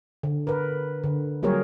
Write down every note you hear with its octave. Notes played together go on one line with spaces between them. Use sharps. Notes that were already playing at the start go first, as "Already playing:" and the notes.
D3
A#4 B4
D3
F#3 G3 A#3 G#4 A#4 C#5